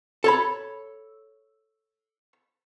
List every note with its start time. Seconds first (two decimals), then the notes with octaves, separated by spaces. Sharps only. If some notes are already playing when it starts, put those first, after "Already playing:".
0.24 A4 C#5 B5